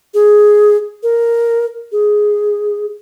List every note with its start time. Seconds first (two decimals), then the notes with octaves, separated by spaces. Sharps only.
0.14 G#4
1.03 A#4
1.92 G#4